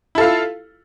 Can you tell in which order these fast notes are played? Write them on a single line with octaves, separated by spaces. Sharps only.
E4 A4 F5 F4